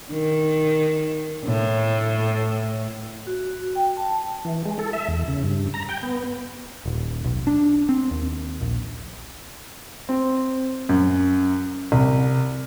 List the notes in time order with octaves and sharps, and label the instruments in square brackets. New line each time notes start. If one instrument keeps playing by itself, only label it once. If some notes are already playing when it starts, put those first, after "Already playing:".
[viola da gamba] D#3
A2
[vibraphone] F#4
G5
A5
[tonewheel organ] E3
G#3
A4
E5
E2
C#3
G2
A#5
G5
B3
[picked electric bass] D#1
B1
D4
C4
D#2
A#1
[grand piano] C4
F#2
C2